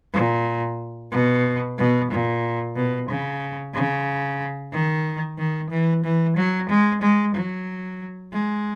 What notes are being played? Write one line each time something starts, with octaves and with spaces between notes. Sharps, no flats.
A#2
B2
B2
A#2
B2
C#3
C#3
D#3
D#3
E3
E3
F#3
G#3
G#3
F#3
G#3